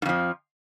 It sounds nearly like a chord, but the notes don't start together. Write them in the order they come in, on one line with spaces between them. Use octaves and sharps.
G#2 F2 F3